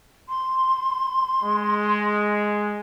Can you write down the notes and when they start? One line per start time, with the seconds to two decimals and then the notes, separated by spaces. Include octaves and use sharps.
0.29 C6
1.44 G#3